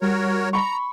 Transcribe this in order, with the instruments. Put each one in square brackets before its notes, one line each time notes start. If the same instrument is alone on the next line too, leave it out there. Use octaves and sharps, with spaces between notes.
[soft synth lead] G3 [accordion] F#4 A#4 C#5
[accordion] A#5 [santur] B5 C#6